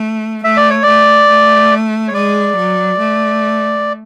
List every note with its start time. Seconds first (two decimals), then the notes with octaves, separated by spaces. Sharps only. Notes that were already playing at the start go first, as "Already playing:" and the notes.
Already playing: A3
0.44 A3 E5
0.57 D5
0.70 C#5
0.83 A3 D5
1.29 A3
2.08 C#5
2.13 G#3 D5
2.56 F#3
2.99 A3